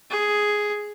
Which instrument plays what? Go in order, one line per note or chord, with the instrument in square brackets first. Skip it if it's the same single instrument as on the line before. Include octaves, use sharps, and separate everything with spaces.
[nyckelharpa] G#4